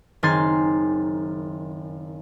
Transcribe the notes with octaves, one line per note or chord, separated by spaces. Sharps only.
F#1 D#3 C4 G#5 C6 A6